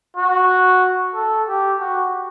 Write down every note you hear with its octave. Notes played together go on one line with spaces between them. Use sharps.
F#4
A4
G4
F#4